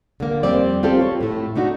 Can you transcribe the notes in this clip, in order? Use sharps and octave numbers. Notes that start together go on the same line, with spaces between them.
D3 A#3
F2 G3 C4 D5
C4 F4 G4 A4
A4 C#5
A2 A3
A3 D4 D#4 F#4